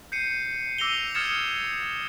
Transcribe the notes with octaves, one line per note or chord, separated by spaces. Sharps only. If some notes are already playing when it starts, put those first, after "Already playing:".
G6 C7 C#7 D#7
D6 E6 A#6 D#7 F7 G7
D#6 F6 G#6 A6 C#7 E7